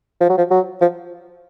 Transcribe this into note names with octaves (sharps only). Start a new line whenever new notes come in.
F3
F#3
F3
F#3
F3